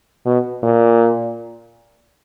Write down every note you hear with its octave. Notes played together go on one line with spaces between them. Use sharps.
B2
A#2